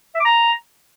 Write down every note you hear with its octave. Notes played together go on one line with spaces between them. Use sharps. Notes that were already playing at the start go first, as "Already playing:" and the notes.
E5
D6
A#5